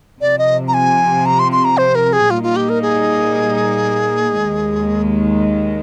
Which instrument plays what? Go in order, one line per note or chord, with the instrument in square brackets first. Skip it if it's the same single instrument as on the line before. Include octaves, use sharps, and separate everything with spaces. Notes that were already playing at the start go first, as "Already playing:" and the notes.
[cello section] C3 F3 C4 [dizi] D5
[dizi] D#5
A#5
G#5
A#5
C6
C6
A#5
C5
A#4
G#4
[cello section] A#2 G3 A#3 D#4 [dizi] F4
[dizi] F4
G4
A#4
G#4
[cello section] D#2 D#3 G#3